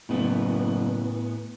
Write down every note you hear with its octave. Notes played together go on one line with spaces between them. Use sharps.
F#1 A2 B3